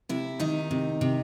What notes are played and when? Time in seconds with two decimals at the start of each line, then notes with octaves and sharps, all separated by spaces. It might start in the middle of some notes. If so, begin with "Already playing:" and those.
0.09 C3 E4
0.40 D#3 D#4
0.71 C3
1.01 C3